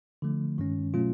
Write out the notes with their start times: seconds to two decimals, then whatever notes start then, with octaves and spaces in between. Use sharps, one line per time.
0.22 D3 F3 A3
0.58 G2 D#3 G#3 C#4
0.94 B2 F#3 A3 C#4 F4